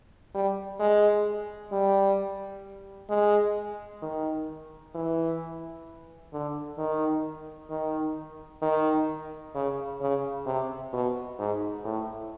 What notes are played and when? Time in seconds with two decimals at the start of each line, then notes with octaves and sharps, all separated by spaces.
0.34 G3
0.80 G#3
1.72 G3
3.10 G#3
4.02 D#3
4.95 E3
6.33 D3
6.78 D#3
7.70 D#3
8.62 D#3
9.55 C#3
10.01 C#3
10.46 C3
10.93 B2
11.39 G#2
11.85 A2